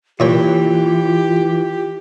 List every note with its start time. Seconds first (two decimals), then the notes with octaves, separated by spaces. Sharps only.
0.20 A#2 E3 F4 G4 C#5 G5